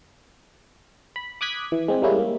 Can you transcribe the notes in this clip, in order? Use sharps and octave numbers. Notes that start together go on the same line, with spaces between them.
B5
D6 D#6 F#6 G#6 B6
E3
G#3 C4
G3 G#3 A#3 C#4 E4
A#3